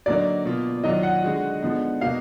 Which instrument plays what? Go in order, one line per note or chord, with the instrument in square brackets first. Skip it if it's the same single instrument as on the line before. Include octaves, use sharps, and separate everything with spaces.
[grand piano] D3 F#3 A#3 D#4 F#4 [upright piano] D5
[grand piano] B2 A#3 F4
[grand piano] D#3 F#3 D4 F4 [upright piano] D#5
[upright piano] F#5
[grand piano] D3 G#3 D#4 F#4
D3 F3 G#3 B3 D#4
[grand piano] B2 A#3 D#4 F#4 [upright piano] F5